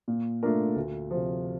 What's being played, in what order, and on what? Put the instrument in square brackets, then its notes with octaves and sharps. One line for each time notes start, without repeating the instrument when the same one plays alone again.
[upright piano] A#2
A3 D4 F4 A#4
D2
C3 F3